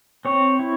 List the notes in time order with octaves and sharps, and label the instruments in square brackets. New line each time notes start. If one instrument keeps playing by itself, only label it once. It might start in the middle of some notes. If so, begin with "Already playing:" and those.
[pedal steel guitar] C4 C#5
E4